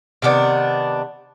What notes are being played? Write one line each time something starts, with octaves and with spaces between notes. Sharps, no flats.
C3 D#3 B3 D4